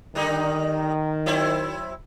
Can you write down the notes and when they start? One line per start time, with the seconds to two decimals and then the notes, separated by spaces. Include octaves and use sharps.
0.15 D3 D#3 G3 D#4
1.26 F#3 C4 E4